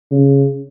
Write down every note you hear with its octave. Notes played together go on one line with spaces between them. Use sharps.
C#3